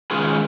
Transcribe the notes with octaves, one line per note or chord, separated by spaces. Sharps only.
D#3 G#3 C#4 F4 G#4